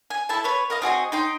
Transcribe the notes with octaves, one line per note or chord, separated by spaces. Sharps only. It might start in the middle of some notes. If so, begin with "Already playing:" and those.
G#5
E4 A4 A5
B4 C#5
A#4 D#5 F5
C4 F#4 G#4 D#5
D#4 G5 C6